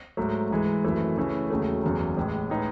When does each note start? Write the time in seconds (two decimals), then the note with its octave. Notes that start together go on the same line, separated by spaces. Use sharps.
0.17 G#2 F#3 A3
0.51 G#2 E3 G#3
0.84 G#1 F#2 E3 A3
1.17 C#3 E3 A3 C#4
1.50 E1 D#2 C#3 F#3 A3
1.83 F#1 E2 C#3 F#3
2.17 A1 A2 G#3
2.50 A2 G#3 D#4 G#4 B4